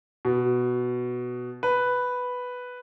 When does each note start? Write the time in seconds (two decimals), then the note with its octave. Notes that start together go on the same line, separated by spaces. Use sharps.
0.25 B2
1.63 B4